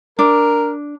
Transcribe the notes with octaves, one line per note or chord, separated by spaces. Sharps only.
D4 A#4